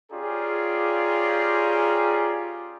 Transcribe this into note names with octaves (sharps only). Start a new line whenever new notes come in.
C#4 F4 G4 G#4 D5 A#5